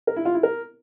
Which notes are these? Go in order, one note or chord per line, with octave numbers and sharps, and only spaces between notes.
A#4
E4
F4
E4
A#4